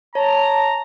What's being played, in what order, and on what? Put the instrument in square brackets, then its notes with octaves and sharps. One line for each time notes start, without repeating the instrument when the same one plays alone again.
[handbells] C#5 [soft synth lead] A5 [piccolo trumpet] A#5